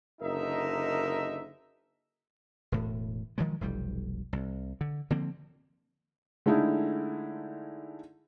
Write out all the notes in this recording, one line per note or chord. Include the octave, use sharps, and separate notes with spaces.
F#1 D3 D#4 A#4 D#5 E5
E1 A2
D#3 F3 F#3 G#3
F1 B1 G3
C2
D3
D3 F3 A#3 C4
D3 G#3 A3 D#4 E4